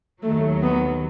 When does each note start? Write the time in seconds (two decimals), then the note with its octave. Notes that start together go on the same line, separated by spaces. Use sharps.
0.22 D#2 D#3 F#3 A3
0.63 B3